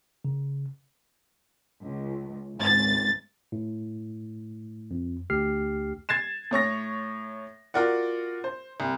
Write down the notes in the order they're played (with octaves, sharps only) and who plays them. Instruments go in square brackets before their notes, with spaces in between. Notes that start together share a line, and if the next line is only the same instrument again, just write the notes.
[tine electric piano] C#3
[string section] C#2
G#1 C#2 A6
[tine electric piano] A2
F2
D2 G4 F6 C7
[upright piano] G#6 A6 C7 E7
A2 C#5 C#6 A#6
F4 F#4 A#4 D5 F#5
C5
C2